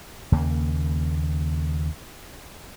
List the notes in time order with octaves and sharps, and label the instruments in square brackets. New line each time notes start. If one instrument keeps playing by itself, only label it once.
[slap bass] D#2 C#3 A#3